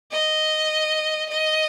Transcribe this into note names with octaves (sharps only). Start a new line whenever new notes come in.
D#5
D#5